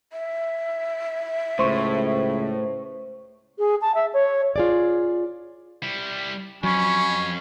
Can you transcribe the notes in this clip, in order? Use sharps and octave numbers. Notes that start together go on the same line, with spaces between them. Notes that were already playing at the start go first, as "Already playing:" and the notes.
E5
C#2 A2 C5 C#6
G#4
A5
E5
C#5
F4 G#4 D5
G3 E4
F2 F#3 C#4 G#5 B5 C#6